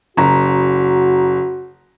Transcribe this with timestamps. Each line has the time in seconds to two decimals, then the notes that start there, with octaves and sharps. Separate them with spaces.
0.17 F#1 F#4 A#5